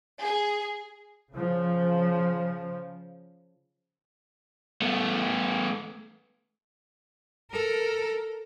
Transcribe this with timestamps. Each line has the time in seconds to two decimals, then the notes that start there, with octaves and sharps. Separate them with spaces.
0.21 G#4
1.33 C#3 F3
4.82 A3 B3
7.51 A4 A#4